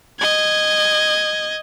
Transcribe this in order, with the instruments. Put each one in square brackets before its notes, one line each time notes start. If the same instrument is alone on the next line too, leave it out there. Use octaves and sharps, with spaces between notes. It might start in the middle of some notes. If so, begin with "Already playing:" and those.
[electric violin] D#5 G#6